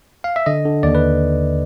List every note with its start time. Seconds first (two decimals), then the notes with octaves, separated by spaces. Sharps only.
0.24 F5
0.36 E5
0.46 D3 D#5
0.65 D3
0.83 D#2 D5
0.95 B4